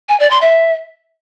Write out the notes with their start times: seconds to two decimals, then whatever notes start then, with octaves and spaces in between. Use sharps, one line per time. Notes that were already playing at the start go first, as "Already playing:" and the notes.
0.09 G#5
0.20 D5
0.30 C6
0.41 E5